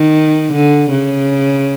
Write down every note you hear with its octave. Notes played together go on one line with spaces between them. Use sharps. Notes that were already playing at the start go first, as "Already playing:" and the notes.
Already playing: D#3
D3
C#3